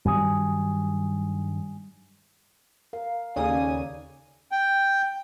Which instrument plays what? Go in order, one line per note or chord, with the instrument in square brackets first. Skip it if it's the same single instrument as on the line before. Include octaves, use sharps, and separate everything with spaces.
[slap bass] G2 D#3 F#3 [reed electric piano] G3 G#5 D#6
[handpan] A#4 [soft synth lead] F5
[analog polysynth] D#2 C#3 D#6 [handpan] D#4 A4 D5 [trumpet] G#5
[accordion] G5